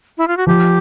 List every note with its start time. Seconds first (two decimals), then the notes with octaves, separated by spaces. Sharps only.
0.18 E4
0.28 F4
0.37 F#4
0.47 F3 G4